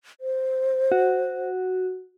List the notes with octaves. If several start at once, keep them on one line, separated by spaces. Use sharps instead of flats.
C5
F#4